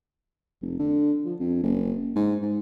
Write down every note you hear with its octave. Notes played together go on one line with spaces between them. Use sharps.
F1
D3
F3
F2
F#1
G#2
G#2